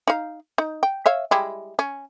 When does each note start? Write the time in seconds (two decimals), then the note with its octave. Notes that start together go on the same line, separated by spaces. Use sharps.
0.08 D#4 F5
0.58 D#4
0.83 G5
1.06 C#5 E5 F5
1.31 G3 G#3 E4
1.79 C#4